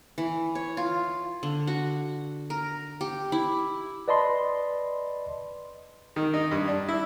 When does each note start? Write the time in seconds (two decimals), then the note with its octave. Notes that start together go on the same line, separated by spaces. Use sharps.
0.18 E3
0.55 C#5
0.77 F4
1.43 D3
1.67 F#4
2.50 A#4
3.01 G4
3.32 E4
4.08 B4 D5 D#5 A5 B5 C6
6.16 D#3
6.33 D#4
6.51 G2
6.68 D4
6.89 E4